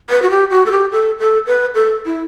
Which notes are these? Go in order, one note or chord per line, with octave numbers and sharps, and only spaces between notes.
B4
F#4
G4
F#4
A4
G4
A4
A4
B4
A4
E4